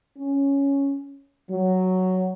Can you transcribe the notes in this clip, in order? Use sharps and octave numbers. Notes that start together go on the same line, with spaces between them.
C#4
F#3